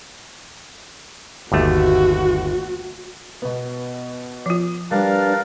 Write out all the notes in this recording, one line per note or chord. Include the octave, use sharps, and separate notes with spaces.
G1 D#2 A3 F#4
B2 B3
F3 F4
G3 D4 A#4 B4 D5 F5